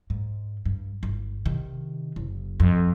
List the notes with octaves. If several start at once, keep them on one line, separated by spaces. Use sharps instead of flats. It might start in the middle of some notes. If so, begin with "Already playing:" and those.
G#2
G2
G1
C3 D#3
F#1
F2